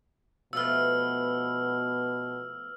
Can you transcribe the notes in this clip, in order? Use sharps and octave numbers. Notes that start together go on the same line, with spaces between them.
B2 F3 A3 B3 E6 F6